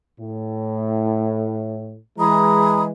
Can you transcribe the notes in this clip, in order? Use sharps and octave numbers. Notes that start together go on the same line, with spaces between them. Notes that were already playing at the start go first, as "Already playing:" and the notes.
A2
E3 G#3 A#5 B5 D#6